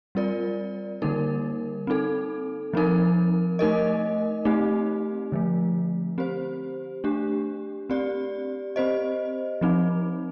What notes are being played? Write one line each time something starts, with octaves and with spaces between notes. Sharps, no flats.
G3 C4 F4 A#4 D5
D3 G3 A#3 D#4 A#4
C4 D#4 A4
F3 C4 D#4 A#4
A3 D#4 A#4 D#5
A3 C4 D#4 G4
D3 F3 A3
C4 G4 C5
A3 D4 G4
C4 G4 D5
C4 G4 C5 D#5
F3 C4 D#4